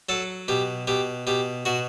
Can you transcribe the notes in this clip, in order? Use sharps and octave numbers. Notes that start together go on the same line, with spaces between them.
F#3 A4
B2 G4
B2 G4
B2 G4
B2 F#4